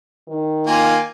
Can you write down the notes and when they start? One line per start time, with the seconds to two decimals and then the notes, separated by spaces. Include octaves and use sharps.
0.28 D#3
0.67 A#3 F4 G#5